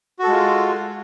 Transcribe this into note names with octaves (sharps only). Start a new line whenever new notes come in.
G#3 F4 F#4 A4